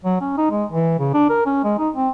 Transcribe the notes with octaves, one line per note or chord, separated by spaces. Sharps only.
F#3
C#4
D#4
G#3
E3
C#3
D4
A#4
C#4
G#3
D#4
C4